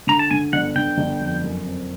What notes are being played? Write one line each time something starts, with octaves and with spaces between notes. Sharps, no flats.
D3 A#5
A5
D3 G#5
G1 F#5
D3 G5
G1
F2
F#2
C4